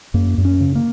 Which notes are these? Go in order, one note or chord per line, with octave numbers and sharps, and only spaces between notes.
F#2 A#3
F#2
C#4
C#3
A#3